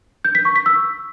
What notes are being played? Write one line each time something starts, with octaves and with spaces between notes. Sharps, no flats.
G6
B6
C#6
B6
E6